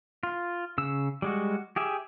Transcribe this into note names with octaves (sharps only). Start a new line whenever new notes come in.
F4
C#3 E6
G3 G#3 F#4
G4 G#4 E5